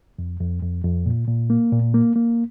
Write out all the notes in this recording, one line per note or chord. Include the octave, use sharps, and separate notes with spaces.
F2
F2
F2
F2
A#2
A#2
A#3
A#2
A#3
A#3